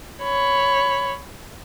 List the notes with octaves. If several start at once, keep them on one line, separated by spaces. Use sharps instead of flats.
C#5 B5